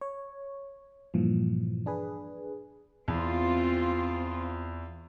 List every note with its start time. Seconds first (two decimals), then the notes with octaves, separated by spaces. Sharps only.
0.01 C#5
1.14 G2 A#2 E3 F3
1.86 D4 G#4 B4
3.08 E2 C4 F4